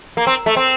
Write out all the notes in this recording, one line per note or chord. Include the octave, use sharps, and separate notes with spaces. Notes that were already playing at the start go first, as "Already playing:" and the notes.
A#3
C4
A3
C4